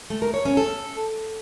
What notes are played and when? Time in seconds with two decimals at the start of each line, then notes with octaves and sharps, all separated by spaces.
0.10 A3
0.22 A#4
0.34 C#5
0.45 C#4
0.57 A4